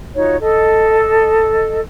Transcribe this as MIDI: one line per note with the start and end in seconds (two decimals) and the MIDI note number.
0.16 0.36 63
0.16 0.36 65
0.16 0.36 66
0.16 0.36 73
0.41 1.80 69
0.41 1.80 75